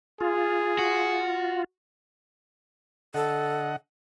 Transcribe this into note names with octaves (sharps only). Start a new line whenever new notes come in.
F4 G#4
F#4
D3 A4 D#5 F#5